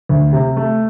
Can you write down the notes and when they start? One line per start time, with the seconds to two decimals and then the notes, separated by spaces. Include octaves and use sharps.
0.09 D2
0.33 C3
0.57 A3